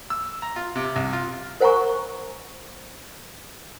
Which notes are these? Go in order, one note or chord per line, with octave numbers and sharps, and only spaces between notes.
E6
A#5
F4
C3
C2
F4
A#4 C5 F#5 G#5 A#5 C#6